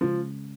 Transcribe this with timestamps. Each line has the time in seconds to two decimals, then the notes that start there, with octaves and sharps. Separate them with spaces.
0.01 C#3 F3 G#3 C#4